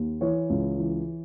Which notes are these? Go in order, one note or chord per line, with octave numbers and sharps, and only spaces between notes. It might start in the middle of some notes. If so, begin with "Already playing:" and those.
Already playing: D#2
E3 C#5
C#2
E3